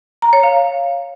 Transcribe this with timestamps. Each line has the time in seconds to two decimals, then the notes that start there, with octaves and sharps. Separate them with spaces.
0.22 A#5
0.33 C#5
0.43 F5